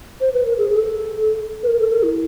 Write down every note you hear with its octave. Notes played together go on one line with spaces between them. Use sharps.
C5
B4
A#4
G#4
G#4
A4
B4
A#4
A4
A#4
E4